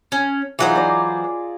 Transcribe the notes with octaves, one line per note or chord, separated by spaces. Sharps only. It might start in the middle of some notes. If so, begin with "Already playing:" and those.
C#4
E3 F#3 D#4 F4 G#4 C5
D5 A#5 D#6